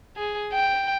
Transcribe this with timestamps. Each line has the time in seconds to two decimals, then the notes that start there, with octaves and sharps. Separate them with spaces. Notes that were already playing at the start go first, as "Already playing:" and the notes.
0.17 G#4
0.53 G5